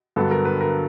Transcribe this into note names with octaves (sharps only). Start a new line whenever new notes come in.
G2 D3 F#3 B3 A4
A#4
B4
A#4